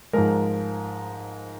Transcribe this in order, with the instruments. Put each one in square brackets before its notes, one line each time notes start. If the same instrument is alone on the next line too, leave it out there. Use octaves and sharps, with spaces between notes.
[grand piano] G#2 F3 G#3 A#4